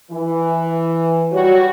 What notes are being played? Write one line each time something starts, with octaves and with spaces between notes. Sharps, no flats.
E3
G3 F#4 C#5